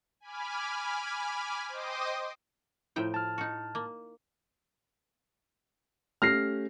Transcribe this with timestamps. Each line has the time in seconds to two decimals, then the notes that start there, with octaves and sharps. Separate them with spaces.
0.20 G#5 B5 D6 F6
1.69 C5 D#5 G5 C6 D6 D#6
2.96 A2 F3 E4 F4 G5
3.14 A5 F6
3.38 D#4 F#4
3.75 A#3
6.22 A3 C#4 G4 F6 A#6 C7